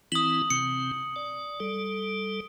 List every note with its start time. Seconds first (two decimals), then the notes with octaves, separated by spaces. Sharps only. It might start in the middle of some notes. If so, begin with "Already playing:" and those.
0.12 E3 C4 E4 D#6 F#7
0.50 C3 C4 C#7
1.16 D5
1.60 G3 A4